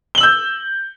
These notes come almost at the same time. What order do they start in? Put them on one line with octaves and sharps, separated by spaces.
G7 F#7 E6 G6